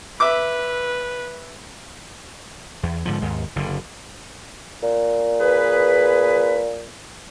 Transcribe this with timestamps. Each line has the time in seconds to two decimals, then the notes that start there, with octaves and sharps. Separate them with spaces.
0.20 B4 E5 D6
2.83 E2
3.05 G#2 D3 F3
3.22 D#2 G#2
3.56 F#1 D3
4.83 A#2
5.39 G#4 B4